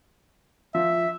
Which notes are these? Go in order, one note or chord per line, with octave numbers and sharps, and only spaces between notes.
F3 E5